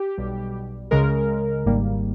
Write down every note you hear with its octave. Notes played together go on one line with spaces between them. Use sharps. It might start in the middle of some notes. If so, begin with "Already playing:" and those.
Already playing: G4
B1 B2 G3
C#2 C#3 G#3 A#4
G#1 G#2 G3 A#3